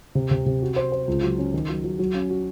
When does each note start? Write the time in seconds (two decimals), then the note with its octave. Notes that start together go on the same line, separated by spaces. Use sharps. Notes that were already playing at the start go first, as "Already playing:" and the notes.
0.15 C3
0.31 C3
0.46 C3
0.62 F#4
0.76 C5
0.92 C5
1.07 C#2
1.23 F#3
1.38 C#4
1.54 D#3
1.69 F#3
1.84 F#3
1.99 F#3
2.14 C#4
2.30 F#4